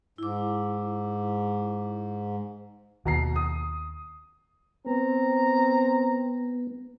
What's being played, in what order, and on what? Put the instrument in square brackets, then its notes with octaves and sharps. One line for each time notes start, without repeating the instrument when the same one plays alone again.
[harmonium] G#2 [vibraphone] E4 D6
[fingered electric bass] D#2 [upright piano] B2 A#5 C7
[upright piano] D#6
[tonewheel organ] B3 [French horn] C4 [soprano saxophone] A#5